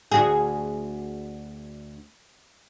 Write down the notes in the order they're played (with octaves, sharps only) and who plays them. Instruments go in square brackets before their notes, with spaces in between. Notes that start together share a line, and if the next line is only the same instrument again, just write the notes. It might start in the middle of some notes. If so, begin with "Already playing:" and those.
[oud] D2 F#4 G#4